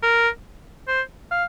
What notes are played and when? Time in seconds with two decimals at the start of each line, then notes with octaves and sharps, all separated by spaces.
0.03 A#4
0.88 C5
1.31 F5